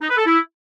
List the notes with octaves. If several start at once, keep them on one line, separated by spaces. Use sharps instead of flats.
D#4
B4
A4
E4